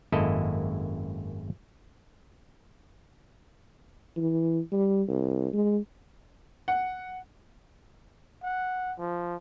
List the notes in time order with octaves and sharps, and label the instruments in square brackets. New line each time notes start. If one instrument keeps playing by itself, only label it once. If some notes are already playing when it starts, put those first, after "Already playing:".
[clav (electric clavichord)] G#1 F#2 A#3 E4 A4 D#5
[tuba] E3
G3
C2
G#3
[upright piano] F#5
[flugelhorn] F#5
F3